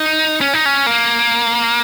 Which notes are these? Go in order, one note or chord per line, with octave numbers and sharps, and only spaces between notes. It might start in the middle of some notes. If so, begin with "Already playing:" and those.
Already playing: D#4
C#4
D#4
C#4
A#3